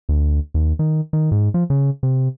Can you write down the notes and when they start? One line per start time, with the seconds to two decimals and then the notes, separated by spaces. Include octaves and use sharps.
0.09 D2
0.54 D#2
0.79 D#3
1.13 D#3
1.32 G#2
1.54 F3
1.70 C#3
2.03 C3